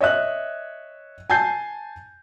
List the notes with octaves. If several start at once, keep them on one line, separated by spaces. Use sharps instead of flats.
C#5 D#5 E5 F#6
G#5 A5 G6 C7